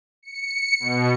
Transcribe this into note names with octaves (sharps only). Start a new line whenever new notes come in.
C#7
B2